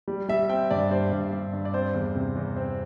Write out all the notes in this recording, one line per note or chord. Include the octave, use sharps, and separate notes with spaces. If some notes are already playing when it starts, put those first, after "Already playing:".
G3
G3 E5
C4 G5
G2 D5
G2 C5
G2
G2
G2
D5
C4 C5
E2
C3
E2
C4